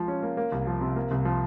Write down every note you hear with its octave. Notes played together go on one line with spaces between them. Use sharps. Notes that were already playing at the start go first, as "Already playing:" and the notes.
Already playing: F3 G#3 F4
C#4
A#3
A#3
C2
F3
C3
A#3
C2
F3